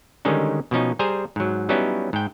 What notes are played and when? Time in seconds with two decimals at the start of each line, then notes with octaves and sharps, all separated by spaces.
0.25 D3 D#3 G3 G#3 C#4 D#4
0.71 B2 F3 C#4 D#4
0.99 G3 G#4 C5 G#5 A#5
1.36 G#2 F#3
1.69 F#3 G3 B3 C#4 D#4 E4
2.13 G#2 G5